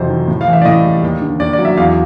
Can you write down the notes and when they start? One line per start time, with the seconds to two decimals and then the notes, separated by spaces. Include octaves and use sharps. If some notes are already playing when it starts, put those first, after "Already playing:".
Already playing: F2 C3 E3 F#3 C5
0.09 D#3
0.28 A2
0.41 F5
0.47 E3
0.53 E5
0.62 D5
0.65 A2 D#5
0.84 G3
1.03 D#2
1.22 D3
1.40 D#2 D5
1.53 D5
1.59 F#3
1.65 E5
1.77 E2 F5